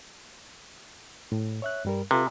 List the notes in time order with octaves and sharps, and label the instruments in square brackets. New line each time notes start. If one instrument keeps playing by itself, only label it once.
[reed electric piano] A2
C#5 E5 F#6
G2 G3 A#4
[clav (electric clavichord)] C3 [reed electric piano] F4 A4 B4